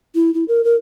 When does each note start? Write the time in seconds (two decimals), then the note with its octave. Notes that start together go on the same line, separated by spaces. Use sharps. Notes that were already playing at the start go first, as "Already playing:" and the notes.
0.15 E4
0.34 E4
0.48 A#4
0.64 A#4